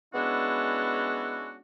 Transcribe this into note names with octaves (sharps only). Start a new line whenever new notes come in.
G#3 B3 C#4 D4 E4 F#4